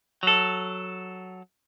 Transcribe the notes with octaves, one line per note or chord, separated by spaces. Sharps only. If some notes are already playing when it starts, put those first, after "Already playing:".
F#3 A4